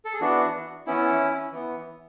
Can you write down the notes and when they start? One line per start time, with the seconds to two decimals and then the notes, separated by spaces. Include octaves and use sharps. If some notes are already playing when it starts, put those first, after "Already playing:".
0.05 A4
0.14 G#4
0.21 E3 B3 D4 F#4
0.87 E3 B3 C#4 E4
1.52 E3 B3